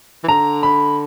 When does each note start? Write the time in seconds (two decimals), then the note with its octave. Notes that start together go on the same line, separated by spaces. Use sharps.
0.24 E3
0.28 D3 A#5
0.63 B5